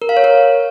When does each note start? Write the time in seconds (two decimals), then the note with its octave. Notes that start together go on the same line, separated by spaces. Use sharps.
0.02 A#4
0.09 F5
0.17 C#5
0.24 A#4